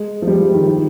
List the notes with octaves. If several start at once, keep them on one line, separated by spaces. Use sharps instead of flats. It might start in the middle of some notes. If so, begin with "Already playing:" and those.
Already playing: G#3
F3
G3
F3
D#3
D#3